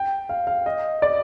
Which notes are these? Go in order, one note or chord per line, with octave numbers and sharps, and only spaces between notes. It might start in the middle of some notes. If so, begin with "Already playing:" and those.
Already playing: G5
F5
F5
D#5
D5